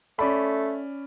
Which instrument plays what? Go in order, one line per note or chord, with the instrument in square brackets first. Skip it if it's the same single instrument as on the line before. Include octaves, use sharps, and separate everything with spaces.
[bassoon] A3 [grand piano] C#4 D5 B5